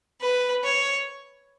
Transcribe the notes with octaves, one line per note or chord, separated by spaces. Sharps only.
B4
C#5